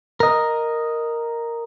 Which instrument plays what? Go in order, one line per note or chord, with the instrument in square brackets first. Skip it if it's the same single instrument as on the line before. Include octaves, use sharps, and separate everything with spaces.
[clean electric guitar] A#4 D#5